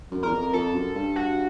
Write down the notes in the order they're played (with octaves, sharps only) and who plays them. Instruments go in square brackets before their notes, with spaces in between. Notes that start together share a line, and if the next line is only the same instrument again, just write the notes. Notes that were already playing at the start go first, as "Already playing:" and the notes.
[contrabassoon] F#2
[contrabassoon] E2 [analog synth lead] A#4
[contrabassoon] F2
[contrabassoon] F2 [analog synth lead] A4
[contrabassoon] F#2
G2
[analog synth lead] F#4